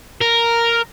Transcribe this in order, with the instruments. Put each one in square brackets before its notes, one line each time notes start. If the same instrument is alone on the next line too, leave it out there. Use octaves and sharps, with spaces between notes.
[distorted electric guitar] A#4